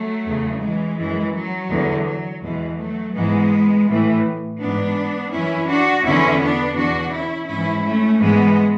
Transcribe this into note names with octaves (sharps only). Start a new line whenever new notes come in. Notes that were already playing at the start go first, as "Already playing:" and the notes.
Already playing: F#3 A3
E2 C#3 E3
E3 G#3
F#2 E3
F#3
E2 D3
F#3
E2 B2 E3 G#3
F#3 A3
G#2 E3 G#3 B3
A2 E3
G#2 E3 B3 D4
F#2 E3 C#4 E4
D4 F#4
E2 D3 C#4 E4
B3 D4
E2 B2 D4 F#4
C#4 E4
G#2 E3 C#4 E4
A3 C#4
G#2 E3 G#3 B3